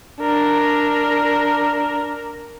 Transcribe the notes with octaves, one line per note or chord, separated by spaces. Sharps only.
D4 A#4